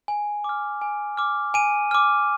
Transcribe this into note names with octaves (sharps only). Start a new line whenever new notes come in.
G#5
D6 F6
G#5
D6 F6
G#5 D#7
D6 F6